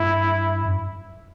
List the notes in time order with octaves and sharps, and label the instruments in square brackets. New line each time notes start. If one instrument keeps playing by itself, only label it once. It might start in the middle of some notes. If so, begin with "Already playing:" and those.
Already playing: [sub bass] G2 [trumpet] E4
[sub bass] F#2